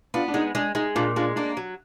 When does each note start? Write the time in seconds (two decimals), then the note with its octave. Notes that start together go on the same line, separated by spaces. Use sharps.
0.14 B3 D4 F4
0.28 D4
0.34 G#3 D#4
0.55 G#3 D4
0.75 G#3 D#4
0.96 A#2 D4 F4
1.16 G#3 D4 F4
1.36 A#3 D4
1.57 F#3